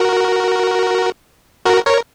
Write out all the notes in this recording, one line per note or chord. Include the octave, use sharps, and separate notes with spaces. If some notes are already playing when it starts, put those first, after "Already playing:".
Already playing: F#4 A#4
F#4 A#4
A#4 C#5